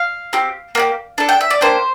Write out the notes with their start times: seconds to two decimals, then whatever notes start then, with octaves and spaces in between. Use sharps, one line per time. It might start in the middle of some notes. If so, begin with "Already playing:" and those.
Already playing: F5
0.33 C4 G4
0.75 A#3 D4 G4
1.18 D4 A4
1.29 G5
1.41 E5
1.50 D5
1.61 A#3 D4 G4 C5